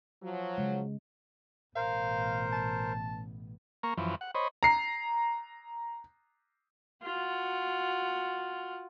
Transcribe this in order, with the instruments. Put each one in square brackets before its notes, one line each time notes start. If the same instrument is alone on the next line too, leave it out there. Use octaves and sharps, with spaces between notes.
[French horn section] F3 F#3
[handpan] C#3 G#3
[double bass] A1 B2 [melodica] A#4 C5 [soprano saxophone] F5
[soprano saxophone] A5
[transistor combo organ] A#3 A#5 C#6
F#2 E3 F3
F#5
C5 C#5 D#5 B5
[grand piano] A#5 C7
[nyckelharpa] F4 F#4